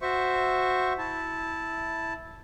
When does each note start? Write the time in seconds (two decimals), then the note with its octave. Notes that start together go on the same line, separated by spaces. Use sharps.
0.02 F#4 C5 E5 C#6
0.98 E4 A5